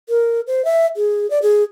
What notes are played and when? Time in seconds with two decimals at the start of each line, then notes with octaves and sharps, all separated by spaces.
0.09 A#4
0.47 C5
0.65 E5
0.96 G#4
1.30 D5
1.42 G#4